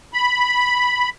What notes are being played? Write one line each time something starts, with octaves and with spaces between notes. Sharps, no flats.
B5